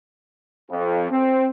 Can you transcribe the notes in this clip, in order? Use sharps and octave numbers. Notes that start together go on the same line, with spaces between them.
F2
C4